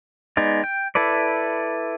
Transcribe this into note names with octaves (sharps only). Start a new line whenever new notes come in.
G#3 B3 D#4 D5
G5
E4 A4 B4 D5